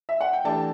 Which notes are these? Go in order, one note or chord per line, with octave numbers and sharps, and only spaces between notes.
E5
F#5
G5
E3 A3 D4 G4 A5